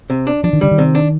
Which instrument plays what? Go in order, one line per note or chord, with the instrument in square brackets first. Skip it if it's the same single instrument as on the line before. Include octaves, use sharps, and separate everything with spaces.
[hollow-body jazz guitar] C3
D4
[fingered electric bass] F3 [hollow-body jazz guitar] D4
[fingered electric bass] D#3
[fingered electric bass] D3 [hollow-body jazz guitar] G3
[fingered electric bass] D#3
[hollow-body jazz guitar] C3
D4